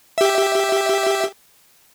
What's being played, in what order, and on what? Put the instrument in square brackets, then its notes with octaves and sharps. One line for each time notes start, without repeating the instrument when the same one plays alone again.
[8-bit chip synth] G4 E5